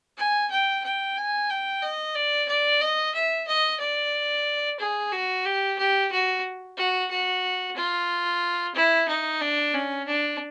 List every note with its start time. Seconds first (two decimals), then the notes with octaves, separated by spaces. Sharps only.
0.17 G#5
0.50 G5
0.84 G5
1.17 G#5
1.49 G5
1.82 D#5
2.15 D5
2.48 D5
2.81 D#5
3.15 E5
3.48 D#5
3.80 D5
4.79 G#4
5.12 F#4
5.45 G4
5.78 G4
6.11 F#4
6.77 F#4
7.10 F#4
7.77 F4
8.75 E4
9.08 D#4
9.41 D4
9.74 C#4
10.07 D4